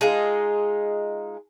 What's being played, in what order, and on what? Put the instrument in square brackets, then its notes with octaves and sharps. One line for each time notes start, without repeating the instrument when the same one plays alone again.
[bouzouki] G#3 D#4 F4 [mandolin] G#4